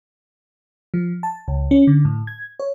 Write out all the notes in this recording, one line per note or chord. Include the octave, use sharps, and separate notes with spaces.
F3
A5
C#2
C#4
D3
A2
G#6
C#5